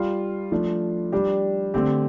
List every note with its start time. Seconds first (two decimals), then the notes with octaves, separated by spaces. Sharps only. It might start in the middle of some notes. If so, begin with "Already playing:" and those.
Already playing: G3 F4
0.52 F3 A3 D4
1.12 G3 D4 G4
1.74 D3 A3 C4 G4